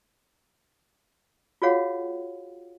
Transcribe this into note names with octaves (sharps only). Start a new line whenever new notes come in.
F4 F#4 G#4 C#5 F5 F#5